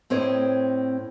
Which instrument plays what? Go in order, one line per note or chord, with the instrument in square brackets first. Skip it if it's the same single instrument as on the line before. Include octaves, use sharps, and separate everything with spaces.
[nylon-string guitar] A2 C4 C5 C#5 D#5